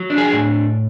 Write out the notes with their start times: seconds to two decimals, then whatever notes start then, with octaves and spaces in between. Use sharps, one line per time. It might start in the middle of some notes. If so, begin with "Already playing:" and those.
Already playing: F#3
0.10 D4
0.18 G#4
0.33 A2